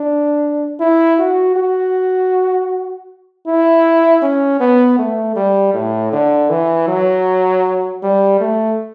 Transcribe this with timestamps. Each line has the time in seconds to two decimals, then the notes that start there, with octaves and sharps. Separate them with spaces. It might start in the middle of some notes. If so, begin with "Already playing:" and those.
Already playing: D4
0.80 E4
1.19 F#4
1.56 F#4
3.47 E4
4.22 C#4
4.60 B3
4.99 A3
5.36 G3
5.74 A2
6.12 D3
6.50 E3
6.88 F#3
8.03 G3
8.40 A3